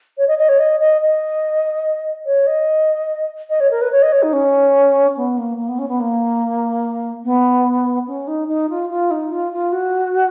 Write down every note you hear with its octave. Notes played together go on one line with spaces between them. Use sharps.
C#5
D#5
D#5
C#5
D#5
D#5
D#5
C#5
D#5
D#5
C#5
A#4
B4
C#5
D#5
C#5
D#4
C#4
B3
A#3
A#3
B3
C#4
B3
A#3
B3
C#4
D#4
D#4
F4
F4
D#4
F4
F4
F#4